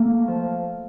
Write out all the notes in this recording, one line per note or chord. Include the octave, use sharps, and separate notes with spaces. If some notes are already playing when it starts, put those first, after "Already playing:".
Already playing: A3 A#3
F3